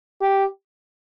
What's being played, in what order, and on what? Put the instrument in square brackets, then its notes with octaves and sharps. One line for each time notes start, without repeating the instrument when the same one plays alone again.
[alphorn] G4